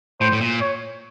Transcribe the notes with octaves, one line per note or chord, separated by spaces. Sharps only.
A2 C5
A2
A#2
C#5